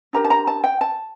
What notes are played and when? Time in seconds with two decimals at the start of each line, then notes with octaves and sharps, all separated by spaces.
0.13 D4 G4 A#4 A#5
0.24 A5
0.30 A#5
0.47 A5
0.64 G5
0.81 A5